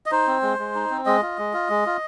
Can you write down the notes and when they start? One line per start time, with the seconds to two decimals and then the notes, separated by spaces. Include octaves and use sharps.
0.06 D#5
0.12 D#4 C5
0.27 C4
0.42 G#3
0.59 G#3
0.75 D#4
0.91 C4
1.06 G#3 D#5
1.22 F4
1.38 G#3
1.53 F4
1.69 G#3
1.86 F4